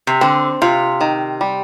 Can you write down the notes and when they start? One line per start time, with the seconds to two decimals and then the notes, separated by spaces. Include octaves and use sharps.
0.07 C3
0.21 D3 C4
0.62 C3 F4
1.01 D#3
1.41 G3